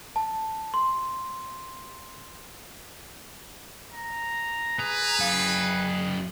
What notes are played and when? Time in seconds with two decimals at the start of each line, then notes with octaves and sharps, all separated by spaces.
0.16 A5
0.74 C6
3.94 A#5
4.79 G#4 B4 A#5
5.20 F#2 F5